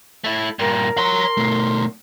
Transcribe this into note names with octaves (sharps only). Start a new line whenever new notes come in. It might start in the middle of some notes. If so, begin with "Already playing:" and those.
A3 E4
G2 A#2 A#4
C#5 A#5 C6
B2 A3